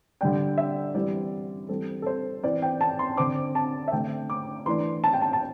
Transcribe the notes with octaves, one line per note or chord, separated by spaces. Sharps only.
D3 G3 D4 G5
E5
E3 G3 C4 D5
E3 G3 C4 A4
A4
C5
E3 C4 D5
G5
A5
C6
D3 C4 D6
A5
E5
D3 A3 C4 G5
D6
E3 A3 D4 C6
A5
G5
A5
A5